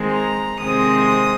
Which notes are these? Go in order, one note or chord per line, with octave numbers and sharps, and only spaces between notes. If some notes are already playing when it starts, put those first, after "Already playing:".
Already playing: D#3 G#3 C4
A#5
C3 D#3 G#3 C4 D#6